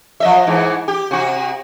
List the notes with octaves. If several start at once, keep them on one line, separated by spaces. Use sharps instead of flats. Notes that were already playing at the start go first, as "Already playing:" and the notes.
F3 D#5 E5
G#2 E3
G4
C3 F#4